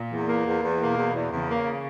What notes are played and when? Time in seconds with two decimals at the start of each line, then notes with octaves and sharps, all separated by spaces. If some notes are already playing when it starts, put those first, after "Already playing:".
Already playing: A#2
0.11 E2
0.28 A#3
0.45 E2
0.63 E2
0.80 B2 A#3
0.98 E2
1.14 E2
1.32 E2 C#3
1.49 A#3